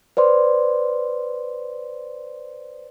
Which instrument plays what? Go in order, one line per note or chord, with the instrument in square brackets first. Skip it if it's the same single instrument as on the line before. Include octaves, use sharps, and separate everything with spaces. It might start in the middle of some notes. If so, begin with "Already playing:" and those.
[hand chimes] B4 C5 D5 C6